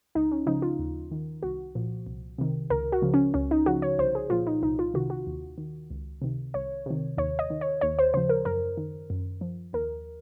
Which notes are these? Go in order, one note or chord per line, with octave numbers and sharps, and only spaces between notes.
C#2 D#4
C#4
C#3 F3 D#4
F4
D#2
D#3
C2 F#4
A#2 F3
C2
C3 D#3
C#2 A#4
F#4
C#3 F3
C#4
C#2 C#4
D#4
C#3 F3 F#4
C#5
C2 C5
G#4
A#2 F3 F4
D#4
C2 D#4
F4
C3 D#3 F#4
F#4
D#2
D#3
C#2
C3 D#3
C2 C#5
C3 D#3
D#2 C#5
D#5
D#3
C#5
D#2 C#5
C5
C#3 F3 C5
A#4
F#2 A#4
D#3
F#2
F3
D#2 A#4